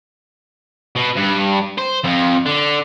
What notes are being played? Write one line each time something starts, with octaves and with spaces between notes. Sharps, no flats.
B2
G2
C5
F2
D3